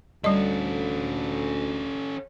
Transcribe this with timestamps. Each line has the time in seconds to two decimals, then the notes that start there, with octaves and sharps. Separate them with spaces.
0.24 D2 G3 C#4 A4 D#5